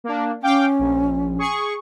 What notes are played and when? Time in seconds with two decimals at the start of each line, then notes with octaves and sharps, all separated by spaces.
0.04 A#3 D4
0.42 C#4 F5 G5 D6
0.79 A#1
1.38 G#4 C#6